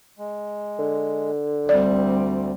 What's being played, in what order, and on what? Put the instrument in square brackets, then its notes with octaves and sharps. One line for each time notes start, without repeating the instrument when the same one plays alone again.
[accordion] G#3
[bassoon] D3
[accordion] D2 [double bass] G3 C4 [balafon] D5